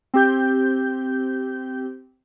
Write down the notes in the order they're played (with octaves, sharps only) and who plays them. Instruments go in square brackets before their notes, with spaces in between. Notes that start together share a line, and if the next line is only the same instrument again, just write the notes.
[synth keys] C4 G4 G6